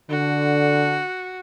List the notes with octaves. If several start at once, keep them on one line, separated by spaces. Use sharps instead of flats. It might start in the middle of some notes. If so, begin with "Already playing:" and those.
D3 F#4